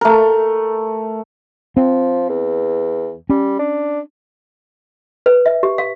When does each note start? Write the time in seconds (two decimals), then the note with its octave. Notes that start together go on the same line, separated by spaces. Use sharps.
0.01 A3 A#4
1.77 F3 C4
2.29 E2
3.29 G3 C#4
3.59 D4
5.26 B4
5.46 E5
5.63 G4
5.78 F5